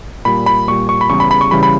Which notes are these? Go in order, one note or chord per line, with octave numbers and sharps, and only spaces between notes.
A#2 G3 B5
B5
A#2 G3 C#6
C#6
B5
E2 C#3 E3 G3 C#6
B5
B5
C#6
C#3 E3 G3 B5
B5